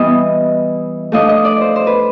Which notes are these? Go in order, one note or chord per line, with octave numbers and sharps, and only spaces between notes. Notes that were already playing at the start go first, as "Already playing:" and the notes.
Already playing: E3 G3 B3 E4 D#5
F3 A3 D4 F4 D#5
D#5
D5
C5
C5
B4